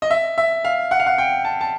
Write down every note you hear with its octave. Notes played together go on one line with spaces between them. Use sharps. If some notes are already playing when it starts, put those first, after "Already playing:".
D#5
E5
E5
F5
F#5
F5
F#5
G5
A5
A5